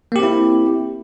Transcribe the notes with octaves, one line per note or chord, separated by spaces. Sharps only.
A#3 C4 E4 G4